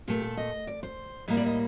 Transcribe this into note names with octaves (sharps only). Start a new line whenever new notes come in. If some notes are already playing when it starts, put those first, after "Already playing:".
A#2 A3 G4
A4
D#5
D5
C5
A2 G3 A#3 D#5
D5
D#5